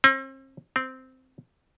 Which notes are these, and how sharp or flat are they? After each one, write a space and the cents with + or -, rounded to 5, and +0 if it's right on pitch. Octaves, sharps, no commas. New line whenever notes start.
C4 +40
C4 -10